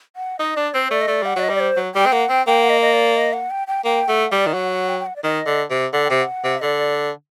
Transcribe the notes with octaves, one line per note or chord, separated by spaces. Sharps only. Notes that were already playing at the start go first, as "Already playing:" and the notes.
F#5
D#4 D#5
D4 D5
C4 C5
A3 D5
D#5
A3 D5
G3 F#5
F#3 D5
D#5
G3
D5
C5
F#3
G3 G5
C4
A#3 F#5
C4 G5
A#3 G5
F#5
D#5
D#5
D5
D#5
F#5
G5
G5
A#3 G5
A3 F#5
G3 D5
D#3
F#3 F#5
F#5
G5
G5
F#5
D5
D#3 D#5
D3
C3
D3 F#5
C3 G5
F#5
C3
D3 D5